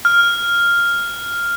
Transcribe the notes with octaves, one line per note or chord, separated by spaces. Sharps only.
F6